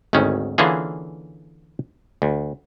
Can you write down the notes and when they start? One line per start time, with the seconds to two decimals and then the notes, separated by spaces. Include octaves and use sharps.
0.13 G#1 D2 D#3 C#4
0.58 D3 E3 A#3 C#4 F4 G#4
2.22 D2